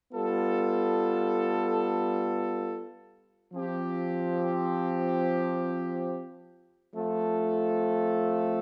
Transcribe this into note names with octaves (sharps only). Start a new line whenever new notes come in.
G3 B3 F4 A4
F3 C4 G4
F3 A3 C4 F4 A4